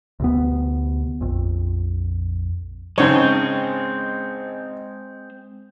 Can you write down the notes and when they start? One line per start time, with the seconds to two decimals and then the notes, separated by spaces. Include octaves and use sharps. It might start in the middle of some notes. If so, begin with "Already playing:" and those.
0.20 D2 C3 B3
1.21 A#1 F2
2.98 G#1 C#3 G#3 C4 C#5